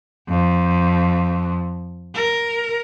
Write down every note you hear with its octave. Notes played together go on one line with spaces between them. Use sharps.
F2
A#4